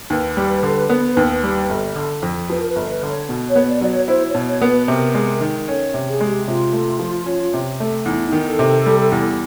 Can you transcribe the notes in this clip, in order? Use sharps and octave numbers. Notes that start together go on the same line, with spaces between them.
D#2 B4
G3
D3
B3
D#2
G3
G1
D3
F2
F3 B4
A#4
B4
G1
B4
D3
C#5
B2
C#5
B3
D5
F#3 D5
C#5
E4 C5
C#5
B2
C#5
B3
B4
C3 A#4
G#3
D#3
C#4 A4
C3
G#4
G#3
G4
C3 F4
A3
F3
C#4
C3
A3
E2 D#4
D4
D#4
D#3
A4
C3
G3
E2